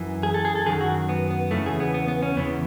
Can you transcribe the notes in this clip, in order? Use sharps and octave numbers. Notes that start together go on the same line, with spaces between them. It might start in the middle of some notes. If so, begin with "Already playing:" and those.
Already playing: F#2 E3
G#4
A4
G#4
A4
F#2 D#3 F#3 G#4
F#4
B3
B3
E2 C#3 E3 A3
G#4
B3
B3
B3
C#4
E2 C#3 E3 B3